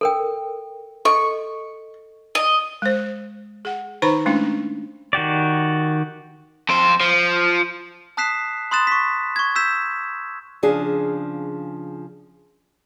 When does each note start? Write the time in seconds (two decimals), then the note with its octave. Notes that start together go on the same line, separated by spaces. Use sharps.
0.01 A4 A#4 G5
1.05 A4 D#5 C#6
2.35 D#5
2.82 G#3 C5
3.65 G#4 F#5
4.02 D#3 D#4 B4 C5 A#5 B5
4.26 G#3 A3 C#4 D4 E4
5.13 D#3 F#4 G4 D5
6.69 F2 C5
7.01 F3
8.17 A5 D#6 F#6 B6 C7 E7
8.71 B5 C6 D#6 F#6 A6 E7
8.87 C#6 B6
9.36 C#6 G#6
9.56 E6 G6 B6 E7
10.63 C#3 F3 D4 G#4